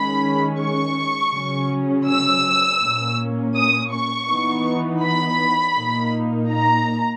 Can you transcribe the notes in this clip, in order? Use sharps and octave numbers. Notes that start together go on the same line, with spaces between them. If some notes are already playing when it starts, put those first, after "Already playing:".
Already playing: D#3 G#3 C#4 B5
C#6
C#3 F#3 C#4
E6
A#2 A#3 C#4
D#6
C#6
E3 B3 D#4
B5
A#2 A#3 D#4
A#5